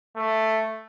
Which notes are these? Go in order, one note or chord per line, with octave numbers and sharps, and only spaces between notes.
A3